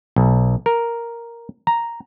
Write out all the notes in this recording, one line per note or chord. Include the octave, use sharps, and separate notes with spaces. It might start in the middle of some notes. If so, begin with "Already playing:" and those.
B1
A#4
A#5